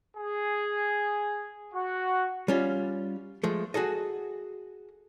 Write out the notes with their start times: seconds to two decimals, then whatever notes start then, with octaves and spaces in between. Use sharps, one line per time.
0.16 G#4
1.73 F#4
2.48 G3 C#4 F4
3.43 F3 G#3 A3
3.74 F#4 G#4 A4 D#5